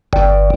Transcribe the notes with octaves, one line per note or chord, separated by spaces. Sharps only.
G1